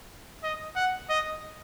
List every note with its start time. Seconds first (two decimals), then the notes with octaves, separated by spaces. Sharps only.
0.43 D#5
0.76 F#5
1.10 D#5